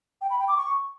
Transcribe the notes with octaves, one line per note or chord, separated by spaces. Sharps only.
G5
B5
G5
D6
C#6